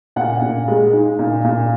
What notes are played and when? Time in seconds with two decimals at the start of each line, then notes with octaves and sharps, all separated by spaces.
0.16 A#2 F#5
0.42 A#2
0.68 G#3
0.93 D#4
1.19 A#2
1.44 A#2